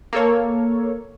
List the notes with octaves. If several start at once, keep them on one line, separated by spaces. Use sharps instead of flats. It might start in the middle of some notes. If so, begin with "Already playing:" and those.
A#3 A4 C#5